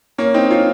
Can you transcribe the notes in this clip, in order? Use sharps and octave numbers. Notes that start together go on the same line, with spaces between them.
A#3 C#4
C4 D#4
C#4 F4